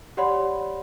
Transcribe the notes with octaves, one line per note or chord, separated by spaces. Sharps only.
G4 C#5 D5 F#5 B5 C6